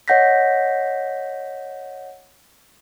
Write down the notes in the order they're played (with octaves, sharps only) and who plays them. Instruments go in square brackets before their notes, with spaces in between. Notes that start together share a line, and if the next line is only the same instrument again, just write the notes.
[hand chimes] C#5 D#5 F#5 G6 A#6 B6